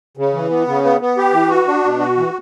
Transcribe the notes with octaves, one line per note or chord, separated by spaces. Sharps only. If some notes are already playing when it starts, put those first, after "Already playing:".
C#3
E3
B3
C#3
B3
B3
G4
E3
F#4
D4
B2
F#4
E3